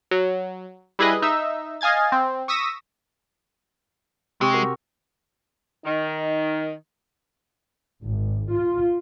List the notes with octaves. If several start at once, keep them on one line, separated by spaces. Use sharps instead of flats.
F#3
G3 E4 G#4 B4 D#5
D#4 E5 E6
D#5 F5 G#5 G#6 A6
C4
C#6 D#6 E6 A#6 B6 D#7
C3 G#3 G4 C#6 E6
F#4 A#4
D#3 D#4
G#1
F4